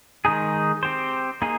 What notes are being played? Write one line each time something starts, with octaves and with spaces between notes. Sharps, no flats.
D#3 G#3 D#4 G#4
C4 G4 C5
A#3 D#4 G#4